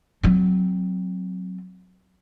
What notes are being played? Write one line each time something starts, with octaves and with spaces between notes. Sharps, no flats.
F#3 C4